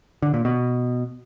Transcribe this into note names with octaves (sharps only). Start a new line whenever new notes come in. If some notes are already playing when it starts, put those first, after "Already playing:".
D3
A#2
B2